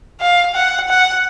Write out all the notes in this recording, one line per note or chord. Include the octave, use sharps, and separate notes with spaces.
F5
F#5
F#5